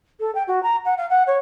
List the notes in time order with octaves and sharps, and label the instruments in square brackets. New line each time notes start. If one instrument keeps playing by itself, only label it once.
[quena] A4
G5
F#4
A#5
F#5
F5
F#5
C#5